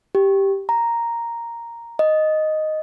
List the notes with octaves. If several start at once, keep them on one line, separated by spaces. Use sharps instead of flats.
G4
A#5
D#5